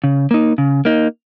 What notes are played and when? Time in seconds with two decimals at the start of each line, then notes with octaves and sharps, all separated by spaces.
0.04 C#3
0.31 A#3 D#4
0.58 C#3
0.85 A#3 D#4